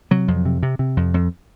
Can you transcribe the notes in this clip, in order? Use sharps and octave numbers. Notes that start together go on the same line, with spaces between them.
C3 F#3
F2
C3
C3
C3
F2
F2